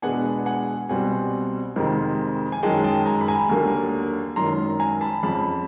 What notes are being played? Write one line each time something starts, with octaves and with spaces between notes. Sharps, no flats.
E2 B2 G#3 B3 D4 F#5 G#5
F#5 G#5
C2 B2 G3 C4 F#5 G#5
F2 C3 D#3 G#3 C4
G#5
F#2 D#3 G#3 G5 A5
G5 A5
G#5 A#5
B5
G#5 A#5
D#2 D3 F#3 A#3
G#1 F#2 D#3 A#5 C6
G#5 A#5
A5 B5
F2 C#3 F3 A5 B5